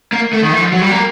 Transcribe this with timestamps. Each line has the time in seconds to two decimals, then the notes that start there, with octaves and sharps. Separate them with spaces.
0.12 A#3
0.33 A3
0.42 D#3
0.52 E3
0.61 F3
0.72 F#3
0.81 G3
0.91 A#3